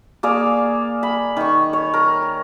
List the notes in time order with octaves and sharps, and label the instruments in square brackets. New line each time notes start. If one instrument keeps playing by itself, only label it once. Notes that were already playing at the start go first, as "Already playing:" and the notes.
[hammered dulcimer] A#3 G#4 D5 F5
B5
D#3 C#6
C#5
A#4